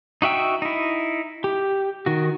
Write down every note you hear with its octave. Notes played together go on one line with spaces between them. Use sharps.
D#4 F#4 E5 G5 E6
D#4 E4
G4
D#3 F#4